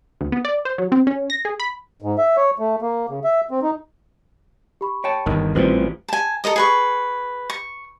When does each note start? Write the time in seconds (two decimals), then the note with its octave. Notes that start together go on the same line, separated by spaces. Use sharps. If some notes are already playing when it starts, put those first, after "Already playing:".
0.21 D2
0.32 B3
0.45 D5
0.65 C5
0.78 F#3
0.92 C4
1.07 C#4
1.30 A#6
1.45 G#4
1.60 B5
2.02 G#2
2.18 E5
2.37 C#5
2.59 A3
2.82 A#3
3.09 C#3
3.24 E5
3.51 C4
3.63 D#4
4.81 G4 B5 C#6
5.04 C#5 G5 A5
5.26 G1 E2 D#3
5.55 A1 A#2 G3 C4 F4 F#4 B4 C5
6.08 G#5 A5
6.44 A4 A#4 D#5 D#6
6.56 G#4 B4 C#6
7.50 C#6